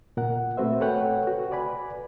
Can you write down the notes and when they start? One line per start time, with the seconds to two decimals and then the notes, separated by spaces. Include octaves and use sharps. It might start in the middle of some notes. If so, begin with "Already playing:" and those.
0.17 A#2 A#4 F#5
0.57 A3 C4 F#4 B4 C5 E5
0.81 A4 B4 C#5 F#5 G5
1.27 F#4
1.51 B4 D5 G#5 B5